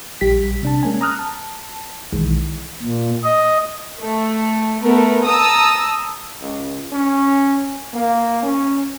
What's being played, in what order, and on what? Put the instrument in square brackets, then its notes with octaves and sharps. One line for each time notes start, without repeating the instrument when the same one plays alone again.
[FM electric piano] A#1 G3 G4 B6
C3 D4 A5
G#3 A#3 C#4 G#5
A#5 D#6 F6 F#6
A5
B1 D#3 E3 G#3
[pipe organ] A#2
D#5
[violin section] A3
A3 B3 A#4
A5 A#5 D#6 E6
[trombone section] C#2
C#4
A#3
C#4